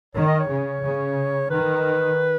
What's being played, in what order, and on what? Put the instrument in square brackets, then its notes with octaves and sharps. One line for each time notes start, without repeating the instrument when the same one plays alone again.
[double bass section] D#3 [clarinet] C#5
[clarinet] D#5
C#5
[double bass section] C#3
C#3
[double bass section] D#3 [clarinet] B4